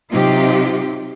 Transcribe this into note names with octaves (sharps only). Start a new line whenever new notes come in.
C3 F#3 D#4 F4 G4